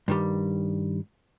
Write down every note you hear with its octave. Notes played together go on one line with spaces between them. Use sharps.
G2 D#3 G3